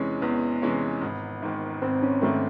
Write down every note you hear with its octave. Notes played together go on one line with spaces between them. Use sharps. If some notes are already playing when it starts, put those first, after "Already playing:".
Already playing: E2 C3 E3 G#3 C#4
E2 B3
C3 E3 G#3 C#4
G#1
G#2 D#3
G#1 C4
C#4
G#2 D#3 A3